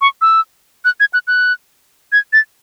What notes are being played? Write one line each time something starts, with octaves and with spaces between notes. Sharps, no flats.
C#6
E6
F#6
G#6
F#6
F#6
G#6
A6